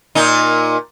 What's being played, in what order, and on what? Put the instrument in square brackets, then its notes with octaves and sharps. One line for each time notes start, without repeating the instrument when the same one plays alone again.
[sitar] A#2 D#4